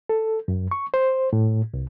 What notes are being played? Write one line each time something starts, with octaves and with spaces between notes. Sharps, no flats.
A4
F#2
C#6
C5
A2
C2